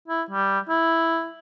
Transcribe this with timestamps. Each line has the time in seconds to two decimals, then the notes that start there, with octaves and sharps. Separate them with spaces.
0.08 E4
0.31 G3
0.69 E4